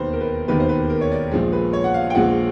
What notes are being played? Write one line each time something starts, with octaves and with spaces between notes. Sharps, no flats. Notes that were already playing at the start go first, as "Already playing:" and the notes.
Already playing: E1 D#2 D#3 B4 C5
A#4
B4
E1 D#2 D#3 B4
C5
B4
A#4
C#5
D5
A#1 A#2 F3 G#3
B4
C#5
F#5
F5
G5
A#1 A#2 F3 G#3 F#5